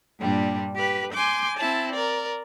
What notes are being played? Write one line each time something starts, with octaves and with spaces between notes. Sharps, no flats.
G2 A#2 G3 D4
G4 B4
G#5 C6 D6 G6
C4 E4 A5
A#4 D5